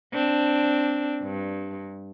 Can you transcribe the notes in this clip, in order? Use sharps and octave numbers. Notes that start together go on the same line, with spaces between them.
C4 D4
G2